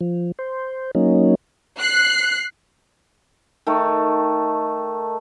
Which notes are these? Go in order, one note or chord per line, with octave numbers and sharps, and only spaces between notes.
F3
C5
F#3 A#3 C#4 D#4
F#6 C7
D#3 A3